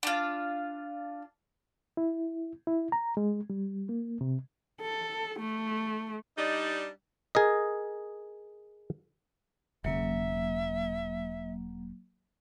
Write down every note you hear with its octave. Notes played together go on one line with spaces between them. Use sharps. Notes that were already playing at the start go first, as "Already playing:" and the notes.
D4 F4
E4
E4
A#5
G#3
G3
A#3
C3
A4
A3
G3 D4 D#4
G#4 A#4 D#5
E1 C#3 F#3 A#3 E5